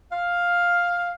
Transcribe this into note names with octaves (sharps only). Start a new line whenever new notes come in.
F5